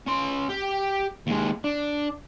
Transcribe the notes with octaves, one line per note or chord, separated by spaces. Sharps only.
C#4 C6
G4
D#2 G#3
D4